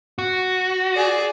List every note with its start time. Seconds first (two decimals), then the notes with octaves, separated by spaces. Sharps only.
0.19 F#4
0.95 G#4 D5